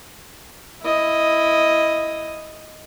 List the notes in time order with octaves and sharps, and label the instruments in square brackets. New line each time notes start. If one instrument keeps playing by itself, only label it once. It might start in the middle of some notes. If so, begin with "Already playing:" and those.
[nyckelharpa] E4 D#5